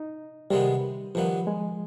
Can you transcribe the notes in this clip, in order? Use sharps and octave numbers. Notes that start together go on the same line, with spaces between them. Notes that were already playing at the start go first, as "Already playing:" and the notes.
Already playing: D#4
C3 D#3 G3 G#3 B3
G2 D#3 F3 B3
G#3